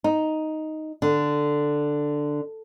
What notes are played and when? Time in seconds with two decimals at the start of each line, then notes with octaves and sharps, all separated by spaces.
0.04 D#4
1.02 D3